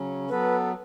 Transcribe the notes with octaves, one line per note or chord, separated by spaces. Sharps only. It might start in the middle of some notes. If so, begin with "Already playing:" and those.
Already playing: C#3 F#3 C#4
F#3 B3 A4 B4